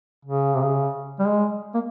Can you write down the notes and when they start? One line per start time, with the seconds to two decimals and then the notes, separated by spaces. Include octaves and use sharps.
0.25 C#3
0.54 C3
0.63 C#3
1.19 G3
1.27 G#3
1.74 A#3